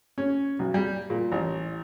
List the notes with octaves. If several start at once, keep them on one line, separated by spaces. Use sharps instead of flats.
C#4
B1
G3
A#2
A1